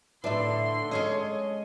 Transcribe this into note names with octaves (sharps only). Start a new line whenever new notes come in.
A2 D3 D4 B4 D5 E5 C6
G#3 C#4 A4 C#5 D#5